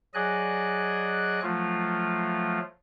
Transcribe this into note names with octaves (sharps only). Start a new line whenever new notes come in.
F#3 G#4 D5 D#5 G#5 F#6
F3 F#3 A3 F4